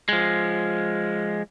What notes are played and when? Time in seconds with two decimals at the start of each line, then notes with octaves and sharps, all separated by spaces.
0.09 F3 G#3